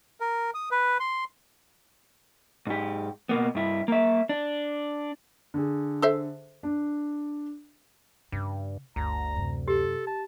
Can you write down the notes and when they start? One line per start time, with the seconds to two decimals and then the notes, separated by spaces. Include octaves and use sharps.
0.20 A#4
0.54 D#6
0.71 B4
1.00 C6
2.67 G#2 G4
3.29 B2 A#3 B3
3.55 G2 E4
3.88 A#3 E5
4.29 D4
5.54 D3 G#4
6.02 A4 C5 E5
6.63 D4
8.32 G2 C#3
8.96 G1 D2 A#5
9.36 F#2 C3
9.68 G4 A4
10.07 A5